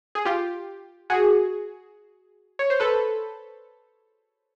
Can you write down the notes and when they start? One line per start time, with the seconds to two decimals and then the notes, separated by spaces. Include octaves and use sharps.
0.15 G#4
0.25 F4 G4
1.10 F#4 G#4
2.59 C#5
2.70 C5
2.80 A4 B4